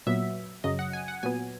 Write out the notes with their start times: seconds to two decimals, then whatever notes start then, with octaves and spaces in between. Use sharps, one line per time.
0.06 A#2 F#3 B3 E5
0.64 F#2 C#3 F#3 D#5
0.79 F#5
0.93 G#5
1.08 F#5
1.23 A#2 F#3 B3 G#5